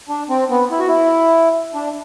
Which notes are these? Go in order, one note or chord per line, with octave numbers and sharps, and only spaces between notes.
D4
C4
B3
E4
F#4
E4
D4